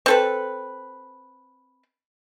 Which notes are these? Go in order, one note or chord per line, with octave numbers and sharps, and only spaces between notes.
C4 A4 B4